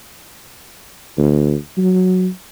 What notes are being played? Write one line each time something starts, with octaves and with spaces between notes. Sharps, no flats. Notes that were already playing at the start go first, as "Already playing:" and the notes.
D2
F#3